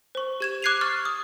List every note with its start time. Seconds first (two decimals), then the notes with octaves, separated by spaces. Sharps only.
0.15 C5 C#6
0.40 G4 G#6 E7
0.62 D6 F#6 G#6 C7 D#7 F7
0.81 C#6 F6 A6
1.05 D#6